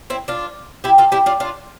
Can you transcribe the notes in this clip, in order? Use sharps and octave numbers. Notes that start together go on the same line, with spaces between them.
C4 E4
D4 F4
E4 G4
F4 A4
E4 G4
D4 F4
D4 F4